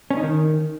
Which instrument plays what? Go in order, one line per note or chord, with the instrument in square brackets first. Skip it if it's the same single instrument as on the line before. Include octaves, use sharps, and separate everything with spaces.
[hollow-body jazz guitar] C#4
D#4
D#3